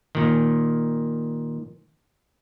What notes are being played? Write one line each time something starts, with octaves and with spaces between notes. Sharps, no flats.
A#2 D#3